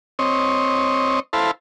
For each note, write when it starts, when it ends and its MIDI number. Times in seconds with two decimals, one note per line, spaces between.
0.19 1.20 60
0.19 1.20 73
0.19 1.20 75
1.33 1.51 64
1.33 1.51 69
1.33 1.51 72
1.33 1.51 77
1.33 1.51 83